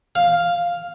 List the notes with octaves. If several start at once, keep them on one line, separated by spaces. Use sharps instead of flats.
F5